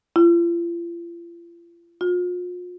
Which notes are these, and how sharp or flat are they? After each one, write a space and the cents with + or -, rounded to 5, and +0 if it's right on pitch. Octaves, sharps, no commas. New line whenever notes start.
F4 -40
F4 +40